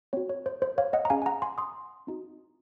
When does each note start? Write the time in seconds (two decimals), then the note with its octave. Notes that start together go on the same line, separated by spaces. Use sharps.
0.13 C4 F#4 C#5
0.29 C#5
0.46 C5
0.62 C5
0.78 C#5 F5
0.93 D#5 F#5
1.05 A#5
1.10 C#4 G#4 F5 G#5
1.22 G#5
1.26 F#5 A#5
1.42 G#5 C6
1.58 C6 D#6
2.07 C4 D#4 F#4